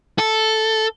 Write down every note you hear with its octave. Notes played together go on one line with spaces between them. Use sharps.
A4